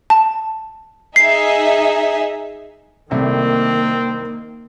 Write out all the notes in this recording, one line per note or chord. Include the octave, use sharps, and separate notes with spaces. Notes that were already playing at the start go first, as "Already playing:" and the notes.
A5
D#4 G#4 E5 C7
C2 C3 D#3 A3 A#3 C4